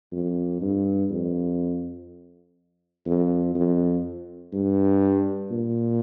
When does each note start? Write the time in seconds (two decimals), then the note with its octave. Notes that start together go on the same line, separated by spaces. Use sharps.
0.12 F2
0.61 G2
1.11 F2
3.06 F2
3.55 F2
4.53 G2
5.51 A#2